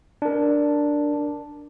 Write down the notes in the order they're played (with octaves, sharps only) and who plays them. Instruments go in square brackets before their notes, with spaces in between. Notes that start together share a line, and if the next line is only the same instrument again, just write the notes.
[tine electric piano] D4 A#4